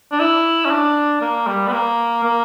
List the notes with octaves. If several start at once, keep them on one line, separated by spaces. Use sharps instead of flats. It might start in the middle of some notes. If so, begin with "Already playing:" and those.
D4
E4
C#4
D4
A#3
G3
B3
A#3
A#3